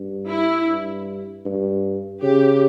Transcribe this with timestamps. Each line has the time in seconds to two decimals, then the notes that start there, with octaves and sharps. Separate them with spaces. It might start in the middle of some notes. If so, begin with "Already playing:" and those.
Already playing: G2
0.28 E4
0.68 G2
1.46 G2
2.22 C#3 G4